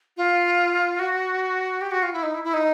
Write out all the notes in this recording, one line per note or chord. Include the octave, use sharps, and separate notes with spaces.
F4
F#4
G4
F#4
F4
E4
D#4
E4
E4
D#4